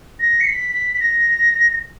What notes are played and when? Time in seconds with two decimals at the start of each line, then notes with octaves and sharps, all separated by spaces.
0.19 A#6
0.40 C#7
0.46 B6
0.73 B6
0.94 B6
1.00 A#6